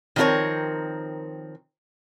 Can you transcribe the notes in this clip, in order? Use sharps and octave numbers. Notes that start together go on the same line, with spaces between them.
D#3 F3 C4 D#4 A#4 C#5